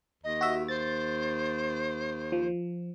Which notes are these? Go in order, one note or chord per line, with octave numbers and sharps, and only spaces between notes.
D#2 D#5
F#4 E5
C5 A6
F3